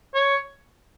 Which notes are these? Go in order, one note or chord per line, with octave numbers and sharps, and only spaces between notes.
C#5